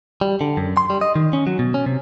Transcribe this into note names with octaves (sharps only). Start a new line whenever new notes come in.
G3
D3
F#2
C6
G3
D#5
D#3
C#4
F#3
B2
C#4
C3